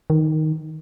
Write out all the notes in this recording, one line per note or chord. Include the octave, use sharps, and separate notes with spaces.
D#3